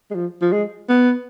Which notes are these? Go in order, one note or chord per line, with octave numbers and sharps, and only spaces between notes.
G#3
F3
F3
G#3
B3